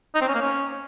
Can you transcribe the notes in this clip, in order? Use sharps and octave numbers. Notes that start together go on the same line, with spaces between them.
D#4
C4
C#4
A#3
C#4